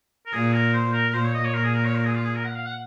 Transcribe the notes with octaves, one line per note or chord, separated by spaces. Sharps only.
A#4
A#2 G#4
A#4
C5
A#4
A#4
A#2 C5
C#5
D#5
C#5
A#2 A#4
G#4
A#4
C#5
A#4
G#4
F4
G#4
A#4
F#5
F5
F#5